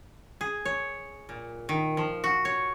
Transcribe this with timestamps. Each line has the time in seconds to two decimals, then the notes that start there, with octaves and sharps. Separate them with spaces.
0.41 G#4
0.65 C#5
1.29 A#2
1.69 D#3
1.97 F3
2.24 F#4
2.45 C#5